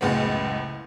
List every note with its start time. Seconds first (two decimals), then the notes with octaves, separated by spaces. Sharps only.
0.01 F#1 C#2 A2 G#3 B3